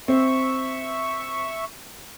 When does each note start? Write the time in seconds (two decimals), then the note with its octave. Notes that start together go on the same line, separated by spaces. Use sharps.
0.08 C4 E5 C#6